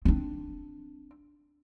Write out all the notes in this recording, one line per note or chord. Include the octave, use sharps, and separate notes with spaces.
C4 D4